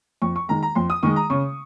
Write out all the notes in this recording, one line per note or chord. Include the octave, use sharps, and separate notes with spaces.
F2 C#6
C#6
D#3 G#3 A#5
A#5
F2 C6
D#6
D#3 G#3 C#6
A#5
C#3 C#6